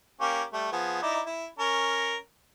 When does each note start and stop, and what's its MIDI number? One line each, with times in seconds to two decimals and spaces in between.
0.21 0.43 58
0.21 0.43 61
0.21 0.43 67
0.53 0.69 55
0.53 0.69 57
0.72 0.98 53
0.72 0.98 59
0.72 0.98 68
1.02 1.21 63
1.02 1.21 64
1.02 1.21 74
1.26 1.47 64
1.59 2.17 61
1.59 2.17 70